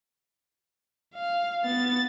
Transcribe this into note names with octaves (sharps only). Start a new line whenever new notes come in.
F5
B3 A6